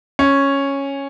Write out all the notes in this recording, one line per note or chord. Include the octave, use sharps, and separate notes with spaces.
C#4